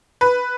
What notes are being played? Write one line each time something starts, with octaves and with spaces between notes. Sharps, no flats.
B4